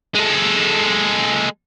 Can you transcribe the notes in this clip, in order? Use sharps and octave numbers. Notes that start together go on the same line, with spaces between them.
G#3 A4